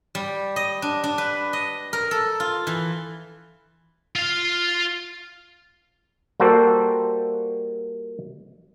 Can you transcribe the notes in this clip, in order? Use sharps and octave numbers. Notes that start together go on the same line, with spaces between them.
G3
D#5
D4
D4
B4
D#5
A#4
A4
F4
E3
F4 F5
G3 A#3 F#4 A4 C5